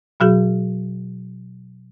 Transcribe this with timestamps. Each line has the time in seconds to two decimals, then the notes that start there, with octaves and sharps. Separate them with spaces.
0.20 B2 F#3 F#4 G#4